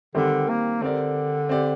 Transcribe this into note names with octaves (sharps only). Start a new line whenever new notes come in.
D3 D#3 G3 C4 G4 C5
A#3
D3 C4 G4 A#4 D5
C4 G4 D5